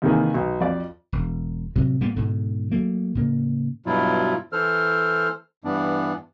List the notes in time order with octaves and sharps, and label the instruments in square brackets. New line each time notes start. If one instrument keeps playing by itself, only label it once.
[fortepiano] D#2 C3 D#3 E3 A#3 G#4
B1
F2 D5
[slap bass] E1
A2 C3 F#3
A2 G3 A#3 B3
G#2 B2 D3
F#3 A3 A#3
A2 C#3 A#3
[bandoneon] G2 B2 F#3 E4 F4
E3 A4 C5 F6
G2 E3 B3 D4